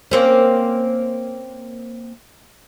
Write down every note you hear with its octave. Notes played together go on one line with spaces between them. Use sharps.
A#3 C4 C#4